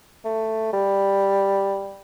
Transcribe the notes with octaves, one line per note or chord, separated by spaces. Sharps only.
A3
G3